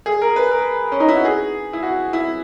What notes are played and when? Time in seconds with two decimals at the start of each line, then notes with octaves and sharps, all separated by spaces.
0.06 G#4
0.21 A#4
0.36 B4
0.51 A#4
0.92 C#4
1.00 D#4
1.08 E4
1.16 F#4
1.25 G#4
1.73 E4
1.83 F#4
2.13 E4